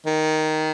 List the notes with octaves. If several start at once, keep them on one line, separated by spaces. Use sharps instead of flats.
D#3